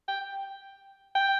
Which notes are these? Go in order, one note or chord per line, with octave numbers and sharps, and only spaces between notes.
G5
G5